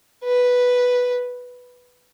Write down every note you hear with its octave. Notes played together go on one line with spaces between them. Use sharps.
B4